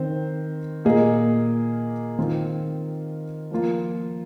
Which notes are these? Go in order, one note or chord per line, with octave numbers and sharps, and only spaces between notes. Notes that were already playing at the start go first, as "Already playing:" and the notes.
Already playing: D#3 C4 C5
A#2 A#3 G#4 D#5
D#3 C4 F4
F3 A#3 F4